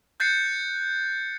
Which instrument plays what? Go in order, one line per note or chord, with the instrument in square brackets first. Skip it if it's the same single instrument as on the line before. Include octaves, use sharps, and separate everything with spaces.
[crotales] F#6 G6 A6 C7 C#7